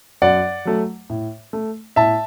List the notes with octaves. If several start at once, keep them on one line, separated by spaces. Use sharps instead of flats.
F#2 D5 F#5
F#3 A3
A2
A3
A2 E5 A5